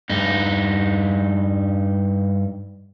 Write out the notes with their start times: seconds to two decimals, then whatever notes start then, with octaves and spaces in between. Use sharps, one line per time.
0.10 G2 D#4